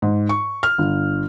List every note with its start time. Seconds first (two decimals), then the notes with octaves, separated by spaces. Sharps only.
0.02 G#2
0.29 C#6
0.63 F6
0.78 G1